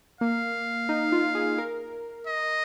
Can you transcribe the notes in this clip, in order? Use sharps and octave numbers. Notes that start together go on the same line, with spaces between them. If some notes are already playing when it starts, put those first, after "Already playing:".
A#3 F5
D#4
F4
G#4
A#4
D#5